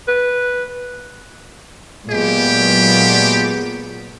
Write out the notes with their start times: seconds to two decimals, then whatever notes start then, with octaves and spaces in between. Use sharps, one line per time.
0.08 B4
2.10 A#2 F#3 G#3 B3 G4